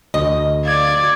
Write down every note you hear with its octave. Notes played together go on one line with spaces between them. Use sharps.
D2 D#5
D5 F5 G#6